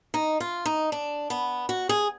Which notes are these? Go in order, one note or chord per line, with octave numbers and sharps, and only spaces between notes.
D#4
F4
D#4
D4
B3
F#4
G#4